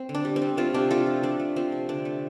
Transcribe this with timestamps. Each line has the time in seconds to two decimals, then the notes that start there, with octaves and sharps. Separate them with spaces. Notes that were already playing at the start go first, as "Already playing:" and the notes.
Already playing: C4
0.09 D3
0.15 D4
0.25 G3
0.36 C4
0.42 G3
0.57 A3 C4 F4
0.74 C3 D4 G4
0.91 A3 F4 A4
1.07 F3
1.23 F3 D4
1.40 A3
1.56 F3 C4
1.72 C3
1.89 D3 D4
2.05 A3